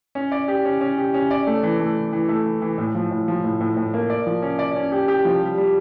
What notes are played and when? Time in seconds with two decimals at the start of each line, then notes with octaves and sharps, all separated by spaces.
0.15 C#4
0.32 D5
0.48 G4
0.65 C#4
0.81 C#4
0.98 G4
1.14 C#4
1.31 D5
1.47 A3
1.63 E3
1.80 A3
1.97 E3
2.13 E3
2.28 A3
2.46 E3
2.62 E3
2.78 A2
2.95 F3
3.11 A2
3.28 F3
3.44 A2
3.60 A2
3.77 A2
3.94 A#3
4.10 D5
4.26 F3
4.42 C#4
4.59 D5
4.76 C#4
4.92 G4
5.08 G4
5.25 F3
5.42 G3
5.58 G3